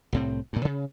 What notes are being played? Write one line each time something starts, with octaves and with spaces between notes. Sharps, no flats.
C2 A2 C4
G2 A#2
C#3